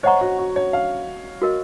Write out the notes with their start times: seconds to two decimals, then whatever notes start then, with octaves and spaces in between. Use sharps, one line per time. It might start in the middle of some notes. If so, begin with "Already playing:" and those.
0.03 C5 C#5 D#5 F#5 A#5 C#6
0.21 F#4
0.39 F#4
0.56 C#5
0.73 F5
1.42 F#4 A#4 D#5